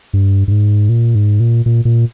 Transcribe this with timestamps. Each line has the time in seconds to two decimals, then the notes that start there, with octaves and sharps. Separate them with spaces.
0.13 G2
0.48 G2
0.51 G#2
0.89 A#2
1.15 G#2
1.40 A#2
1.66 A#2
1.85 A#2